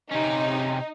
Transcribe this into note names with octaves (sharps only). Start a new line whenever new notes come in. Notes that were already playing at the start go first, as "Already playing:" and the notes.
C3 C#4 D#4